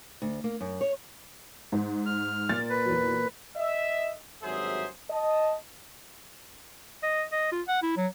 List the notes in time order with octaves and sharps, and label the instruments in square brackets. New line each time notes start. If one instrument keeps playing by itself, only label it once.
[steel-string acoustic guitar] D2
A#3
F#2
C#5
[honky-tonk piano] G#2
[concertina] F6
[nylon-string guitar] A#2 A#3 [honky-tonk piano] A6
[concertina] B4
[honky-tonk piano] E2 F#3
[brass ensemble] D#5 E5
G#1 G2 F#3 G#4 C5 E5
D#5 A5
[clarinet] D#5
D#5
F4
F#5
E4
F#3